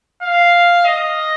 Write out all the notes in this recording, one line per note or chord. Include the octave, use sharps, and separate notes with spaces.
F5
D#5